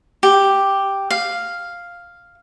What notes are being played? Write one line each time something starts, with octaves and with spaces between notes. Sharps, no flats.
G4
F5